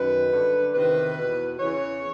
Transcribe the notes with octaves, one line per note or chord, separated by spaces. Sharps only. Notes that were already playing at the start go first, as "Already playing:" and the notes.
Already playing: F#2 D#3 B4
G2 D3
E2 C3 D#3 B4
E2 B2
E2 C#3 E3 C#5